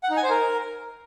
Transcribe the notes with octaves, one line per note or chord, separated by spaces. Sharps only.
F#5
D#4
G#5
C5
A#4